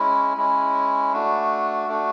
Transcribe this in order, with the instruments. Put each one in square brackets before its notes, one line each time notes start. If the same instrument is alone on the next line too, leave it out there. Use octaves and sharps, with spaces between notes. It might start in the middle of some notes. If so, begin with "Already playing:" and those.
Already playing: [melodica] G#3 C#4 E4
G#3 C#4 E4
A3 D4 F#4
A3 D4 F#4